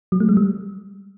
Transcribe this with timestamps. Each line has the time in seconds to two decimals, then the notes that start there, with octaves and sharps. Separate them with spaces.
0.12 F#3
0.20 A3
0.29 G#3
0.37 G3